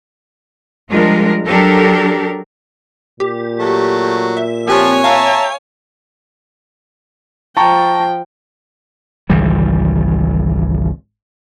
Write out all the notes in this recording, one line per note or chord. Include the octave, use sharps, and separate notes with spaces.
F3 G3 G#3 D4 F4 A#4
F#3 D4 G4 A4 A#4
A#2 G4
F#3 A3
E5
F3 C4 G4 C#5 G#5 F#6
E5 F5 A5 A#5
F3 G5 A5 A#5 C#6
G#1 C#2 E3 G3